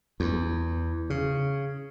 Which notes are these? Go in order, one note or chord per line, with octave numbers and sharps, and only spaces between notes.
E2
C#3